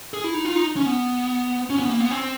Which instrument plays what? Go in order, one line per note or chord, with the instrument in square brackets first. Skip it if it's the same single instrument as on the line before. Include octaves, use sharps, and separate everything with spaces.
[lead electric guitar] G#4
E4
D#4
F4
D#4
C#4
B3
C#4
B3
A#3
B3
C4